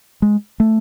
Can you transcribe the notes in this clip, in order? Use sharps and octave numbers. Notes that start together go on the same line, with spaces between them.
G#3
A3